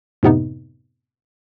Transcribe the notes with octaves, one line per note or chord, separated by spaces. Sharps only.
F#2 A2 C3 B3 D#4